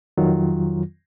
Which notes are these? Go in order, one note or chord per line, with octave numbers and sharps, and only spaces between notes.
F2 D#3 F#3 F4